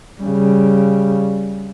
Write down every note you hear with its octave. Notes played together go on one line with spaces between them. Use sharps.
C#3 G3